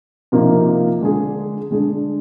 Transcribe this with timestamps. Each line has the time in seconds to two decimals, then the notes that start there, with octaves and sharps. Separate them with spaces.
0.32 C3 F3 A#3 D#4
1.01 D3 G#3 D4 G#4
1.71 D3 G#3 D4 G#4